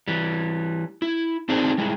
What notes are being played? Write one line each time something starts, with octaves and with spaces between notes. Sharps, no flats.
E3 G3
E4
C4 D4 D#4 G#4 C5
G3 G#3 E4